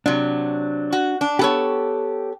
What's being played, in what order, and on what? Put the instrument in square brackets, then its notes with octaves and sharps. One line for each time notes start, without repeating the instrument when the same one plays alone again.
[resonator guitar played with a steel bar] C3 F#3 [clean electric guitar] D4
[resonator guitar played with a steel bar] F#4
D4
[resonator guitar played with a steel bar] B3 A4 C#5 [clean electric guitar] G4